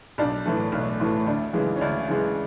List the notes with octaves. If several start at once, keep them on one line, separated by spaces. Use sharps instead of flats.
B1 D4
A2 E3 A3
B1
A2 E3 A3
D2 D4
C#3 E3 G#3
C#4
D2 D4
C#3 E3 G#3